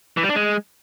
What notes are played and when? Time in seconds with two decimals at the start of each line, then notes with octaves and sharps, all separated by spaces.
0.17 E3
0.23 G3
0.29 D4
0.35 G#3